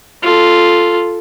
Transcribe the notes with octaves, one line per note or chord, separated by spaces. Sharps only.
F4 A4